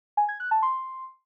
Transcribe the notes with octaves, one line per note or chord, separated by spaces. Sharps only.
G#5
G#6
F#6
A5
C6